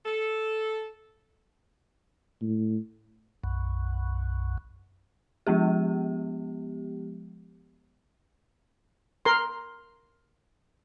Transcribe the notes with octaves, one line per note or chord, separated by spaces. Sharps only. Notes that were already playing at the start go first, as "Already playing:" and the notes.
A4
A2
B1 F#2
F3 G#3 B3 G4
A#4 C6